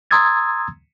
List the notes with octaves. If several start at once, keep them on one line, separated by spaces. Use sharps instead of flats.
A#5 C6 D#6 E6 G#6 A6